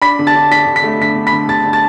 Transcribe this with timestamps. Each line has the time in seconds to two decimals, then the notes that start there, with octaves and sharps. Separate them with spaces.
0.02 D4 B5 B6
0.19 D3
0.27 A5 A6
0.35 D4
0.51 D4 B6
0.67 D3
0.76 B6
0.83 A3
1.00 D3 B6
1.16 D3
1.27 B5 B6
1.33 D3
1.49 D3 A5 A6
1.65 D3
1.73 A5 A6